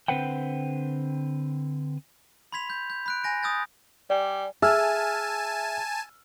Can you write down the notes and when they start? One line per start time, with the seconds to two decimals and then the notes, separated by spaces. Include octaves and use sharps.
0.08 D3 C4 B4 C5 F#5 G5
2.52 B5 C6 G#6 B6 F7
2.70 G6
2.90 G6
3.06 B5 F#6 D7
3.24 G#5 A#6 D7
3.43 D#6 E6 G6 A6
4.10 G3 D5 G#5
4.62 G#4 E5 G#5 A5 E6 F6